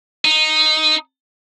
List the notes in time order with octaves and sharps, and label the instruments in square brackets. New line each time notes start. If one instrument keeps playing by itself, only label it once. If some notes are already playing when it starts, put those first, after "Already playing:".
[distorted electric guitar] D#4